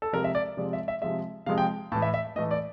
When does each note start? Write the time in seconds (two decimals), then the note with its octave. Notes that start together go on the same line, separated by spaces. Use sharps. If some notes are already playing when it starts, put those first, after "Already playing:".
0.02 A4
0.13 C3 F3 G#3 A#4
0.24 E5
0.35 D5
0.57 C3 F3 G#3 D5
0.73 E5
0.88 E5
1.02 C3 F3 G#3 E5
1.46 C3 F3 G#3 F5
1.58 G5
1.92 A2 E3 A3 A5
2.02 E5
2.14 E5
2.36 A2 E3 A3 D#5
2.51 D5